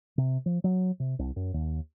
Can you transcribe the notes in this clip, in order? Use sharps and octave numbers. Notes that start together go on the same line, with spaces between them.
C3
F3
F#3
C3
C2
F#2
D#2